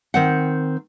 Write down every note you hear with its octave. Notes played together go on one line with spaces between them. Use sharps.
D#3 C4 F#5